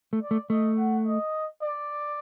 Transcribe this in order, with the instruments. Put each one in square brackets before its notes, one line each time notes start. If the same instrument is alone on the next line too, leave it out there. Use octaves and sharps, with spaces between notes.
[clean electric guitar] A3
[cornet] D5
[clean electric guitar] A3
[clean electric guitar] A3 [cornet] D#5
[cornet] F#5
D#5
D5